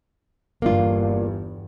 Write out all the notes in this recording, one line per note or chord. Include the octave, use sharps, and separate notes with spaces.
G1 E2 G2 A#3 D4 F4